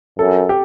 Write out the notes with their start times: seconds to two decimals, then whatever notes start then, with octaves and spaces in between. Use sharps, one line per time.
0.19 F#2 A4
0.49 G4